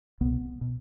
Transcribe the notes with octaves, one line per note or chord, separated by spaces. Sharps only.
C2 B2 B3
B2